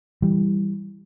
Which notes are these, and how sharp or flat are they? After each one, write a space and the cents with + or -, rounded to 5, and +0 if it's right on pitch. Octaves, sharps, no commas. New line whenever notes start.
E3 +0 G3 +0